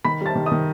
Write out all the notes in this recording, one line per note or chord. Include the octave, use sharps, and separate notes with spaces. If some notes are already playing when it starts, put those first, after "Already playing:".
D#3 B5 B6
G3 A5 A6
D#3
D#5 D#6
D#3